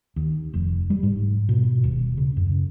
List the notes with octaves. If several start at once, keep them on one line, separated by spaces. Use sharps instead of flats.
D#2
F1
G3
G#2
B2
D#1
C#3
F#2